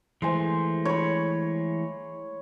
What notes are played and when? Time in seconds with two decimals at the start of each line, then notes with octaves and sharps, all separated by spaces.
0.22 E3 G#3 A3 C5 G#5
0.85 C#5 B5